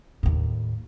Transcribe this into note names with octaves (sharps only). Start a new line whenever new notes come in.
D#2 A2